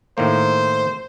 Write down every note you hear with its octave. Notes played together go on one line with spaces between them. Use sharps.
A2 D#3 A#3 C5